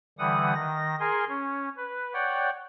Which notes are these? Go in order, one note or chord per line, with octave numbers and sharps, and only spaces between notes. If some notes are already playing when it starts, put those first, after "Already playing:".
D3 E3 G3 F#5 D#6
D#3 A#6
G#4 A#4 G#5 C6
C#4
B4
C#5 D5 F#5 G5